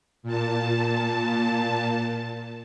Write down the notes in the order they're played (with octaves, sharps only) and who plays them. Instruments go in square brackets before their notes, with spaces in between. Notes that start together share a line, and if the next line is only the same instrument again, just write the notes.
[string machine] A#2 A5